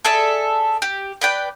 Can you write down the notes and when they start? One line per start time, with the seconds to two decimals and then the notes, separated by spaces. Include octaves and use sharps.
0.05 G#4 A4 D5 E5
0.82 G4
1.21 B4 D5 G5